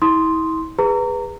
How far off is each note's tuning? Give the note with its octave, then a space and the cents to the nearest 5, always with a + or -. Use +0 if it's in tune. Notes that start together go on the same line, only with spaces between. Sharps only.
E4 -40 C6 +0 D#6 +0
G#4 -20 B4 -5 A#5 -25